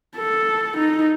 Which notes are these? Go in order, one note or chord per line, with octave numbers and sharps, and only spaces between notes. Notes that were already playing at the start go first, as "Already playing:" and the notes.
A4
D#4